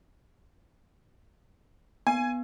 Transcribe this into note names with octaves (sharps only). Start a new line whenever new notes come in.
B3 G#5